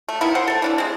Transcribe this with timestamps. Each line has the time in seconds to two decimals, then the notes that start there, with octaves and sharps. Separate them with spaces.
0.08 A3
0.21 D#3 A#3 B3 E4
0.35 C5 F#5 G5
0.48 A3 A4
0.62 E3 D4 E4
0.78 G#3 C4